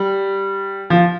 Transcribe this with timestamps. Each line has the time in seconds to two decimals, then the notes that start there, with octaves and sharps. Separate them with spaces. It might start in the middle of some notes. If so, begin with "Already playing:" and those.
Already playing: G3
0.90 F3